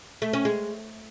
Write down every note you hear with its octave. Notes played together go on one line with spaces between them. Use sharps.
A3
C#4
G#3